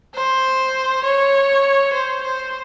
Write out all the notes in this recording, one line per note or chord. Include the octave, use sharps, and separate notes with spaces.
C5
C#5
C5
C5